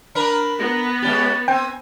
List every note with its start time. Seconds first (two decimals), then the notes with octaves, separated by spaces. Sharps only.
0.15 D4 A#4 B4 B5
0.59 B3 A#6
1.02 G#3 C#4 G4 A6
1.48 C4 G5 G#5